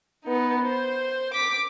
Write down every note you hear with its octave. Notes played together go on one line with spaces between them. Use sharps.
B3 D#4
C5
D6 B6